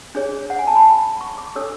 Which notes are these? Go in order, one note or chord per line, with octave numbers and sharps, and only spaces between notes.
D4 G#4 C#5
F#5
G#5
A5
B5
C#6
D6
D4 A4 C#5 E6